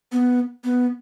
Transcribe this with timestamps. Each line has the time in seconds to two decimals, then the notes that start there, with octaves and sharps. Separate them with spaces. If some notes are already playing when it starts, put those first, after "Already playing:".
0.12 B3
0.64 B3